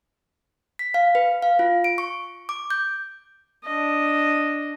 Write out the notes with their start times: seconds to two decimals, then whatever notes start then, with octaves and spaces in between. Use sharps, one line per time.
0.79 B6
0.94 F5
1.15 B4
1.42 F5
1.59 F4
1.84 D7
1.98 C#6
2.49 D6
2.70 G6
3.64 D4 D#5